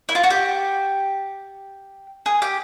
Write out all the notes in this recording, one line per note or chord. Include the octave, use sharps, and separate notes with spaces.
E4
F4
F#4
G4
G#4
G4